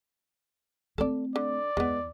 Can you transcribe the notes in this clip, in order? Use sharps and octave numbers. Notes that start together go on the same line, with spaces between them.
A3 C4 A4 D5
D3 D5
E2 G#3 B3